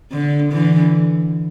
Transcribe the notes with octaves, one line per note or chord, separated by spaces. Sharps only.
D3
D3 E3